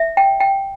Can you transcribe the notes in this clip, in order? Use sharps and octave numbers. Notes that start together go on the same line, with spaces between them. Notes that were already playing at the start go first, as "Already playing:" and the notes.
Already playing: E5
G5
G5